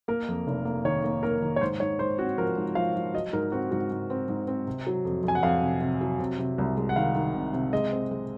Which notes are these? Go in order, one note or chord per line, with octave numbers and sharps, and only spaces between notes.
A#3 A#4
F2
F1
A#3
D#3 C#5
A#3
A#3 A#4
D#3
C#5
G#2 C5
G#2 C#5
G#2 C5
C4 F#4
F3 A#4
G#2
F3 F5
F3
F#3 D#5
G#2 A#4
C4 F#4
G#2 F#4
G#2
C4
G#2
C4
C3
F#3
F2
F2 G#5
F#5
F2 F5
C3
C3
F#3
C3
C3
C2
G#3
F#5
D#3 F5
D#3
C3
C3
G#3 D#5
C4
G#3